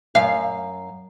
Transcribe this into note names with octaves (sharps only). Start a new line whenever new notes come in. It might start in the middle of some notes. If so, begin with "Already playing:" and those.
F#2 F5